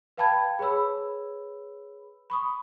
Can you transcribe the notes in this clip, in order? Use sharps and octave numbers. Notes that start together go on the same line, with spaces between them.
B4 F5 G5 A5 B5 G#6
G#4 B4 C#5 B5 E6
B5 C#6 D#6